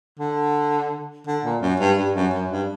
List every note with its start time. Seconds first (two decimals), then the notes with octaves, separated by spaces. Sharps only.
0.19 D3
1.27 D3
1.44 A#2
1.62 F#2
1.80 G2
1.97 G2
2.15 F#2
2.33 F#2
2.51 G2